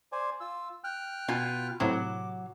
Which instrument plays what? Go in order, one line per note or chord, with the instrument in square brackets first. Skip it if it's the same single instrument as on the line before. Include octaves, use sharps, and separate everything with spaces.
[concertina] C5 D5 G#5
F4 E6
G5 F6 F#6
[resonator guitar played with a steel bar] B2 F4 G#5
[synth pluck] A2 C3 [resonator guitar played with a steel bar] F#3 [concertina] D6